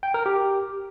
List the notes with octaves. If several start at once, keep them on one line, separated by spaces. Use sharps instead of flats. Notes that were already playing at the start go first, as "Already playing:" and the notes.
G5
A#4
G4